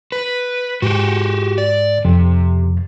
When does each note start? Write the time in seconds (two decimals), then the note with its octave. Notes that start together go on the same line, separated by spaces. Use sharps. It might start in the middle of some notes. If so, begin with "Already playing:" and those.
0.12 B4
0.82 G#2 F#4 G4
1.58 D5
2.05 F2 C3